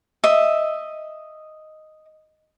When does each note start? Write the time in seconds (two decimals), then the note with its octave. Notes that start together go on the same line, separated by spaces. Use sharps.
0.24 D#5 E5